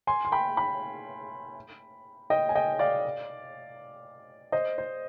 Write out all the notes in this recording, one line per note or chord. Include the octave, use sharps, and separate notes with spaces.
G#5 C6
C6
G5 B5
G5 B5
D#5 G5
G#5
D#5 G5
D5 F5
C5 D#5
C5